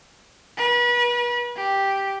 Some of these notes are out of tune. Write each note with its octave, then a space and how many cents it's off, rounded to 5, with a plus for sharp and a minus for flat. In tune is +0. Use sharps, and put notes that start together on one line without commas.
B4 -35
G4 +0